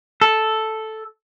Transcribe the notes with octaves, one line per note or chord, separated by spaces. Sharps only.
A4